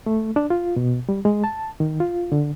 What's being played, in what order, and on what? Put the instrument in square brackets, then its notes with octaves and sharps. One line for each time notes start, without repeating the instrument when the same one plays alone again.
[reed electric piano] A3
D4
F4
B2
G3
G#3
A5
D#3
F4
D3